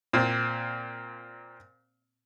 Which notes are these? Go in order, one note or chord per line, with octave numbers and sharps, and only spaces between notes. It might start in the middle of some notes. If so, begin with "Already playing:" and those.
A#2 C4